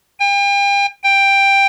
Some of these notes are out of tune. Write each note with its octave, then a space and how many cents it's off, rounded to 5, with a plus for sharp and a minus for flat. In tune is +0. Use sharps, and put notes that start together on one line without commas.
G5 +40
G5 +10